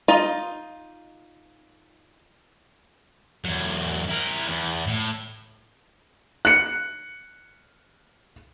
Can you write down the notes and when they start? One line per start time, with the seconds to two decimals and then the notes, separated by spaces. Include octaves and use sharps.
0.08 D#4 F4 D#5
3.45 E2 F#3
4.09 E4 A#4
4.48 E2
4.87 A2
6.45 F#6 C#7